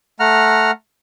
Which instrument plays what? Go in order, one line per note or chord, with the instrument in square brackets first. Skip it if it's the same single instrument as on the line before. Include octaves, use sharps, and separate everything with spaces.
[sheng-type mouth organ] A3 F#5 A#5 F6